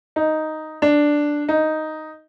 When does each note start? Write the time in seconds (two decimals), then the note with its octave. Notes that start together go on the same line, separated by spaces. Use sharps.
0.16 D#4
0.82 D4
1.49 D#4